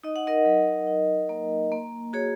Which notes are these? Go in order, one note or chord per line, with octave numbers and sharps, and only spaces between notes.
D#4 D#5
F#5
A#4 D#5
F#3
D#4
A#3
A#3
F#4 G#4 C#5